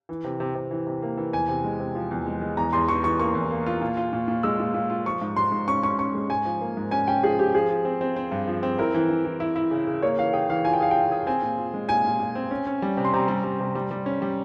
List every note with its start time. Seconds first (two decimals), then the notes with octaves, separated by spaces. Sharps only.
0.09 E3
0.24 C3
0.40 C3
0.55 C3
0.71 E3
0.87 C3
1.02 A#3
1.17 E3
1.33 E2 G#5
1.48 C3
1.64 G#3
1.80 C3
1.95 F3
2.11 E2
2.26 G#3
2.42 G#3
2.57 E2 A#5
2.73 E2 C6
2.88 E3 C#6
3.04 E3 C#6
3.19 A#3 C#6
3.35 E2
3.51 A#3
3.66 F4
3.81 A#2
3.97 F4
4.13 A#2
4.28 A#2
4.43 G#3 E6
4.60 A#2
4.74 A#2
4.90 F4
5.05 F3 C#6
5.21 G#2
5.36 G#2 C6
5.52 G#2
5.68 C#4 C#6
5.83 C#4 C#6
5.99 C#4 C#6
6.15 G#3
6.29 G#2 G#5
6.45 F3
6.61 A#3
6.77 G#2
6.91 C#4 G#5
7.07 C#4 G5
7.23 F3 G#4
7.38 F3 G4
7.54 F3 G#4
7.70 F3
7.85 C4
8.01 C4
8.16 C4
8.31 G2
8.47 F3
8.63 C4
8.78 E4 A#4
8.94 E3
9.10 E3
9.25 E3
9.40 E4
9.56 E4
9.71 C#3
9.87 C#3
10.02 A#3 C#5
10.18 E3 F5
10.33 G#4 G5
10.49 E3 F5
10.65 F4 G#5
10.73 G5
10.80 G#4 F5
10.91 F4 G5
11.12 G#4
11.27 C4 G#5
11.42 A#2
11.58 F4
11.74 G#3
11.89 A#2 G#5
12.04 A#2
12.19 A#2
12.35 C4
12.51 C#4
12.67 C#4
12.82 G3
12.97 C3
13.05 C6
13.13 C3 A#5
13.28 G3
13.44 G3
13.60 C3
13.75 G3
13.91 G3
14.06 C#4
14.22 G3